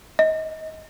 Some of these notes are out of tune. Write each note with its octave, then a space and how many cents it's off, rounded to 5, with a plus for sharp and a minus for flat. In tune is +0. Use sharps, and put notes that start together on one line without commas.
D#5 +25